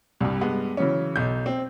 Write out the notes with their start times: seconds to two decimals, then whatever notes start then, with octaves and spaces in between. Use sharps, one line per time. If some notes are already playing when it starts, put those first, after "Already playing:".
0.21 C2 G2
0.41 G2 G#3 B3
0.77 C#3 E3 F#3 C#4
1.16 B1 G6
1.46 C4